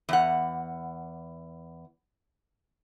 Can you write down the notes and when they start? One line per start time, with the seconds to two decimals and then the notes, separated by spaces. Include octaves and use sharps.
0.09 E2 F#5